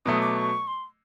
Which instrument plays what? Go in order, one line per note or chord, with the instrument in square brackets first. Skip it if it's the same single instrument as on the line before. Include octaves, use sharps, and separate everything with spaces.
[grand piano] B2 F#3 A3 [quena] D#6
[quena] D6
C#6
C6